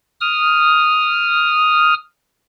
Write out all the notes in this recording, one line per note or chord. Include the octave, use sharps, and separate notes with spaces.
D#6 F6